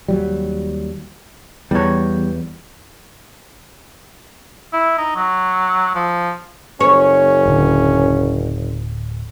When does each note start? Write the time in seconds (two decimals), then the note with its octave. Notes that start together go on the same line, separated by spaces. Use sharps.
0.08 D#2 F#3 G3
1.71 E2 G3 C#5
4.73 E4
4.98 D#4
5.15 F#3
5.95 F3
6.80 F#1 C#4 C#5
7.45 D1 D3